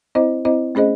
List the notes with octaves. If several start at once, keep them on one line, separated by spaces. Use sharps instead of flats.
C4 E4 C5 D#5
C4 E4 C5 D#5
A3 C#4 G#4 C5 D#5